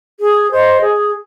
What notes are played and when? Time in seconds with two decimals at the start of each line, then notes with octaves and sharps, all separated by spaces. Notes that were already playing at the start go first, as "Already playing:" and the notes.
0.19 G#4
0.49 C5 D#5
0.80 G#4